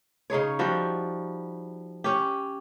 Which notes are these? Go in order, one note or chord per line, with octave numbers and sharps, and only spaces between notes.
C#3 D#4 G#4 C#5
F3 G3 F#4
C#4 G4